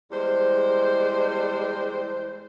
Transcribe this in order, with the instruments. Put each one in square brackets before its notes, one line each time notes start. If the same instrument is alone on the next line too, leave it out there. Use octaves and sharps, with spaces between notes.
[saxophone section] E2 G3 G#3 C5